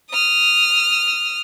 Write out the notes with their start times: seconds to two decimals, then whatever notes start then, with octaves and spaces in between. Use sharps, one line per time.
0.10 D#6 F6